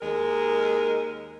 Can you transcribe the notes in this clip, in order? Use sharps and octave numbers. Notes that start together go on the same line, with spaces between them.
D#2 G#3 A#4